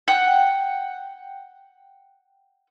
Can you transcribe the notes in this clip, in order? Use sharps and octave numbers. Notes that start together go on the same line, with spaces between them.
F#5 G5